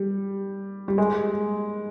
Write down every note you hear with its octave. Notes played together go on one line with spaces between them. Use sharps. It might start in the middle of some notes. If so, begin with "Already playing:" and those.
Already playing: G3
G3
G#3